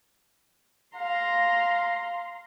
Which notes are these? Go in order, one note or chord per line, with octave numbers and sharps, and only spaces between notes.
F5 A#5 C6